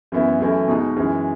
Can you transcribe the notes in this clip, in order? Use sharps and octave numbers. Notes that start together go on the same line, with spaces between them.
F#2 E3 B3 E4
F#2 E3 A3 E4
B2 G#3 D#4
F#2 E3 G#3